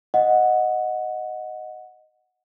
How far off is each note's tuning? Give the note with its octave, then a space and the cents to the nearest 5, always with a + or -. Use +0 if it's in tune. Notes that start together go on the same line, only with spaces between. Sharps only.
D#5 +0 F#5 -10